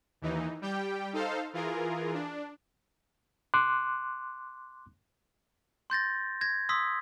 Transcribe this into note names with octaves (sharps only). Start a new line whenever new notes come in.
D#2 E3 D#4
G3 G4 G5
D#4 A4 C5 F5
E3 F4 G#4 A#4
D4
C6 D6 F#6
C6 G6 A6 A#6
G#6 A#6
C6 D#6 E6 B6